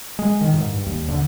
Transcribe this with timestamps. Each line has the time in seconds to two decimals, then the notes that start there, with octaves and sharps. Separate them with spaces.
0.19 G#3
0.41 D#3
0.54 G#2
0.70 G2
0.86 D#2
1.08 D3